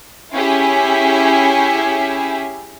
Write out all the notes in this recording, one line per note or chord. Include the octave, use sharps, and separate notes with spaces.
C#4 E4 G4 G#4 E5 G#5